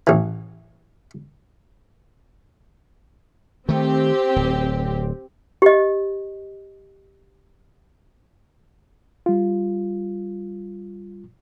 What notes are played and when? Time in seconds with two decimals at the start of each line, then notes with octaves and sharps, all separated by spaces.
0.07 A1 E3
3.69 D#3 A3 C4 G4
4.36 D1
5.62 G4 D#5
9.26 G3 F4